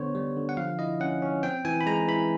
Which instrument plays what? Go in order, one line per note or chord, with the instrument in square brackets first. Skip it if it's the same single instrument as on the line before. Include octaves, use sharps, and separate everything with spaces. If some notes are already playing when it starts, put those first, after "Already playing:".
Already playing: [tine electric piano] D3 B3 C5 C#5
G3
D3
F#5
F3 F5
E4 D#5
C#4 F#5
C#4
C4 G5
E3 G#5
B5
G#3 A#5
E3 B5